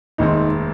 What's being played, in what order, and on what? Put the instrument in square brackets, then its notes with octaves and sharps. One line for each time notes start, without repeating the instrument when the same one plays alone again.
[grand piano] F1 D#2 D#3 G#3 C4 [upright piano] D#4